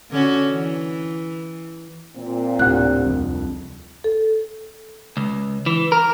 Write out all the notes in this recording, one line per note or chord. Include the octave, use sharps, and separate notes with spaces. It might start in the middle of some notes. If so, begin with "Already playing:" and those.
D3 C#4 F#4
E3
A#2 C4
D2 A2 C3 F#6
C2 F2
A4
C#2
E3
A#4